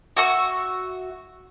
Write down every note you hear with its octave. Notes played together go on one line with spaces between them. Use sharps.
F#4 E5 C#6